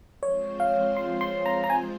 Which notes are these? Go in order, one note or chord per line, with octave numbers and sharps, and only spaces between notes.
F3 G#3 C4 F4 C5 C#5
F5
C6
C6
A#5
A#5
G#5